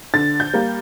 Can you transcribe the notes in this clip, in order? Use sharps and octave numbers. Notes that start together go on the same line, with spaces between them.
D3 A6
G6
G3 A#3